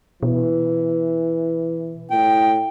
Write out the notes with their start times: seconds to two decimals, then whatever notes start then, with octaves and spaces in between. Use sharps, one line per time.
0.23 B2 E3
2.11 A2 G5